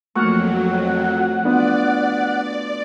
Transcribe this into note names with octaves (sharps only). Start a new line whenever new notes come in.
F2 F#3 A3 A#3 F#4 F#5 C#6 F6
B3 D4 F4 D5